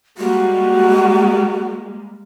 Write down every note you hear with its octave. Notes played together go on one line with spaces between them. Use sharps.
G3 G#3 A#3 F#4